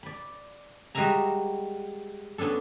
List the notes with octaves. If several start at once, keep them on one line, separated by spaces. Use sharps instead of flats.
D5 B5
G3 G#3 F#4 A#4 E5 A#5
B3 C#4 D4 A4